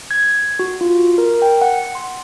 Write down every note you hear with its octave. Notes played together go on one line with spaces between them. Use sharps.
G#6
F#4
F4
A#4
G5
F#5
C6